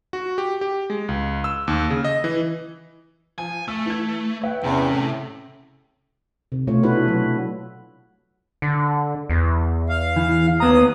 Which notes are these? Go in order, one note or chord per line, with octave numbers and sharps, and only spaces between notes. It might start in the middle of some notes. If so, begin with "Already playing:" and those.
F#4
G4
G4
G#3
C#2
E6
D#2
C#3
D#5
E3
F3 G#5
A3 E6
E3 G#6
B4 C#5 E5 G5
E2 C3 C#4
A2
C3
B2 A3 F4 C#5
D4 E4 F#4 B4
F#3
D3
E2
F5
E3
D#2 B3 A#5 D#6